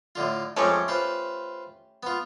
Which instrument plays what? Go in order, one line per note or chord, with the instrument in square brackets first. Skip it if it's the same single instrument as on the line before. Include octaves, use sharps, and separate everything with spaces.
[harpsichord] A2 D3 F4
[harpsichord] F2 G#3 C#5 [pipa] A3 C#4 G4
[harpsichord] F4 B4 C5
B3 F4